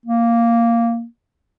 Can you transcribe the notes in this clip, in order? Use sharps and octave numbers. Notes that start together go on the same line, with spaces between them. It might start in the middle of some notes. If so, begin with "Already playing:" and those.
A#3